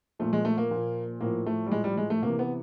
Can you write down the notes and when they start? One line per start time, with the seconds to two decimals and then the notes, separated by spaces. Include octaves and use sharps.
0.19 A#2 F3 A3
0.33 G#3
0.45 A3
0.58 A#3
0.71 A#2 F3
1.21 A2 F3 A#3
1.46 A3
1.67 G3
1.72 A2 F3 G#3
1.84 G3
1.97 G#3
2.10 A3
2.22 C3 E3 A#3
2.39 B3